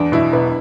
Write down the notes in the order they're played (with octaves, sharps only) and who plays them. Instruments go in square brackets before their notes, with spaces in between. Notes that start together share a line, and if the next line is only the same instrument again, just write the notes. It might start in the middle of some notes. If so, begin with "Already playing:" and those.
Already playing: [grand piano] E2 [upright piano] D4
[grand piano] B2 [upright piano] E4
[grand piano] E1 [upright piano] B4